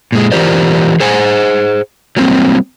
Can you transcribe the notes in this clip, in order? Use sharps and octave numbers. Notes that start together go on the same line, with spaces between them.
A#2 G#3
E3 F4 G4 A#4 C5 D5
G#4 C5 F#5 G#5
F#3 G3 A#3 C4